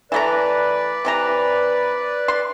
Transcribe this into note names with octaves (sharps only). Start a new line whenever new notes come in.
E3 A3 B4 D5 A#5
C3 E3 A#5
C6